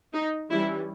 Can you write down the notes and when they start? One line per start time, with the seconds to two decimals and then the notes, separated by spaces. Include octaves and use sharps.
0.14 D#4
0.51 E3 G3 C#4 E4